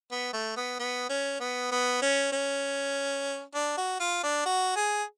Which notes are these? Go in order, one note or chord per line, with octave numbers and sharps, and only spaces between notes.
B3
A3
B3
B3
C#4
B3
B3
C#4
C#4
D4
F#4
F4
D4
F#4
G#4